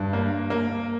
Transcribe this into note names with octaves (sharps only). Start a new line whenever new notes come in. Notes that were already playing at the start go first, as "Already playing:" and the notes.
Already playing: G2
A#3
A#3